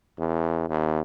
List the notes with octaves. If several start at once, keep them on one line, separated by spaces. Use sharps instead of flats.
E2
D#2